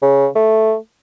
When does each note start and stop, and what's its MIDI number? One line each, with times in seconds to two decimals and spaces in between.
0.02 0.27 49
0.35 0.75 57